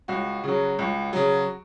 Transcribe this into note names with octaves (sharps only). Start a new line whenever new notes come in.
C#2 F#4
C#3 F#3
C#2
C#3 F#3